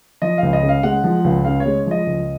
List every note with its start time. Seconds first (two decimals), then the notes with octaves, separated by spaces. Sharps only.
0.22 F3 D#5
0.38 C#2 F5
0.53 D#5
0.63 C#3
0.69 F5
0.83 G#3 F#5
1.04 F3
1.24 C#2
1.45 C#3 F5
1.60 C#5
1.66 G#3
1.86 F3 D#5
2.07 C#2